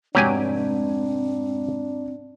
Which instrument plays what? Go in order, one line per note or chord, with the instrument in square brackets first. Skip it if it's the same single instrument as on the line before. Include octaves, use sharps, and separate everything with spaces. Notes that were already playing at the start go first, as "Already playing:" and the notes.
[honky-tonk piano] F1 G#2 D7 [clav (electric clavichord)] F#3 G4 G#5 [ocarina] C4 [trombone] D4